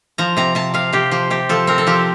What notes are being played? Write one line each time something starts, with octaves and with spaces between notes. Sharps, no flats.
F3 A#5
C3 A#5
C3 A5
C3 F5
C3 G4
F3 G4
C3 G4
F3 A4
C4 A#4
A4
F3 G4